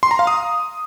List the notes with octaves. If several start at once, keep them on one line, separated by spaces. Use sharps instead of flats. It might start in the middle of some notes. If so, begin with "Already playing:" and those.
C6
A#5
F5
D#6